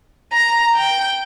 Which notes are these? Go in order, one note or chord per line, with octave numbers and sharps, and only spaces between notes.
A#5
G5